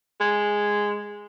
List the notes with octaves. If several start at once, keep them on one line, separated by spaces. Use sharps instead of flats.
G#3